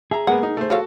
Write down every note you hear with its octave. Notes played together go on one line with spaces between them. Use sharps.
G#4 E5 A#5
G#3 A#3 B3 F#5
D#4 A#4
A3 C5
F3 F#4 A4 C#5 F5